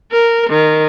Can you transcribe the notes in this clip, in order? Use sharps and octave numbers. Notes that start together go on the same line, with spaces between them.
A#4
D#3